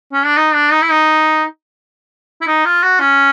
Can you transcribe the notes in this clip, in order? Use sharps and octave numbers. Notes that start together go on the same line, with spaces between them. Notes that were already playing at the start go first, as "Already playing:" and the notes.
C#4
D4
D#4
D4
D#4
E4
D#4
E4
D#4
F4
F#4
C#4